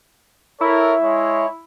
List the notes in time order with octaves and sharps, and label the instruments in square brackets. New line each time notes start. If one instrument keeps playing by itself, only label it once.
[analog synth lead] E4 [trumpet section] A4 A#4 C#5
[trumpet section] G#3 C#5